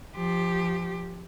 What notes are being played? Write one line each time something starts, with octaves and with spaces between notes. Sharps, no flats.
F3 G4